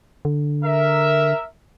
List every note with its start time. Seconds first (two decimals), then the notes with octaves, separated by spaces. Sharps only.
0.25 D3
0.64 A#4 E5